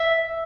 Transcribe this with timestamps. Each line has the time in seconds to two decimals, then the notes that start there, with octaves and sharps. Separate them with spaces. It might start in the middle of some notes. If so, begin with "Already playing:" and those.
Already playing: E5